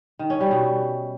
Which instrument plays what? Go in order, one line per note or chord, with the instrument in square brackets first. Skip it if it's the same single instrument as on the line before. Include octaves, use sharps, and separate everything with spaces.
[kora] D#3
C#4
G3
B2